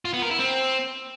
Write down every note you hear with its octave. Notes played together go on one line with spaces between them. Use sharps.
F4
B3
A#4
E4
C4